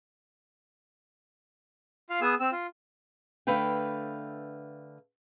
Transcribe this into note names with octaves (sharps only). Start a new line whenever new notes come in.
F4 F5
B3 G#4 G#5 E6
C4 E6
F4
D3 A3 B4 F5 G5